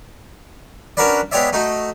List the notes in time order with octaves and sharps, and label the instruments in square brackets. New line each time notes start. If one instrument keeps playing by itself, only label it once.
[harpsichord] C#4 D4 F#4 A#4 B4 D5
G#3 B3 G4 C#5 D5 E5
A3 D#4 F#4